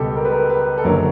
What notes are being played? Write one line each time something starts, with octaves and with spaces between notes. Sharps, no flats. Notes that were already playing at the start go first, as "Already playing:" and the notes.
Already playing: C#2 B2 G3 G4 A4
A#4
B4
A#4
B4
A4
F#1 F#2 D3 F#3 A#4